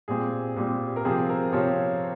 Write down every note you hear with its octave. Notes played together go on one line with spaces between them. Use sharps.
A#2 G3 C4 G#4
A#2 G3 C4
A#4
C3 F3 C4 G#4
A#4
C3 F3 C4 C#5